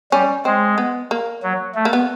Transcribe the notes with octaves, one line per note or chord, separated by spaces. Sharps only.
G3 C#4
G#3 C4
B3
A#3
F#3
A3
A#3
B3